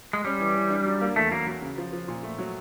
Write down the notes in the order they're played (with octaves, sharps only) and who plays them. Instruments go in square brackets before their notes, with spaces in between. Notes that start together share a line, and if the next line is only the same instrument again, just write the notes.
[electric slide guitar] G#3
[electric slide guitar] G3 [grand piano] C#4
[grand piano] E3
E3
D4
F#3
A#3
[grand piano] E2 [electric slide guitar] A3
[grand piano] F#3 [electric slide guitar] A#3
[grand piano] F#3
C#3
F3
F3
A#2
A3
F#3